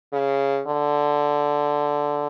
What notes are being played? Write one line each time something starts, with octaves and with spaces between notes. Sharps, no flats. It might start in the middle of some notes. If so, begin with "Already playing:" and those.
C#3
D3